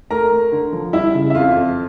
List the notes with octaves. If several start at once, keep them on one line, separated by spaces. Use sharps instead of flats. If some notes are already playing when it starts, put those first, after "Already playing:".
A3 A#4 A#5
A3
D3
F3
G3 E4 E5
C#3
E5
F2 F4 F5
F2